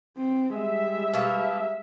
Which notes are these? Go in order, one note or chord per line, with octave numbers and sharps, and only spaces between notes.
C4
G3 G#3 E5
B2 A#3